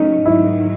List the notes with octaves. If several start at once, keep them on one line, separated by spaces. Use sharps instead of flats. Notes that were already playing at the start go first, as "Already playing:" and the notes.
Already playing: C#3 F#3 A3 C#4 D#4
G#2 D#3 F#3 E4